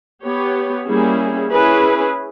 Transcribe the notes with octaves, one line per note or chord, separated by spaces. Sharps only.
B3 G4 C#5
G3 A#3 C#4 E4 G#4
C#4 E4 G#4 B4